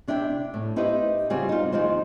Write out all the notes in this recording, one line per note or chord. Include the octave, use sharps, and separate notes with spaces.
C3 D4 E4 E5 G5
A2
D#4 E4 G4 B4 C5 D#5
C#3 G3 C4 F4 F#4 G#4
D#4 F4
E2 D#3 F3 D#4 F4 C5